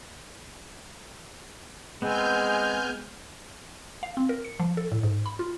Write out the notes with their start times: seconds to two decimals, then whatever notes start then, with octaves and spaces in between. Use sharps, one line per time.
2.02 G#3 B3 C4 G#5 F6 G6
4.03 F5
4.17 C4
4.29 A#4
4.45 C#7
4.60 F3
4.77 A4
4.92 A2
5.03 G#2
5.26 B5
5.39 F4